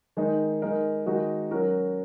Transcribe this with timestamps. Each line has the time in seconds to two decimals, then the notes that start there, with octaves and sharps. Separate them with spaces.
0.17 D#3 G#3 D#4
0.62 G#3 D#4 A#4
1.06 D#3 G#3 D#4 F#4 A#4
1.51 F#3 C#4 F#4 A#4